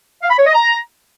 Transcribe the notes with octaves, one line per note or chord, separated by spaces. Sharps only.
F5
B5
C#5
D#5
A#5